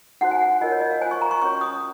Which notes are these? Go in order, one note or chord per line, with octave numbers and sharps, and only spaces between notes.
D#4 F#4 C5 F#5
G#5
F#5
F4 A#4 C#5 D#5
C#5
D#5
F5
F4 C5 G#5
C#6
A#5
C#6
C#4 F#4 C#5 C#6
D#6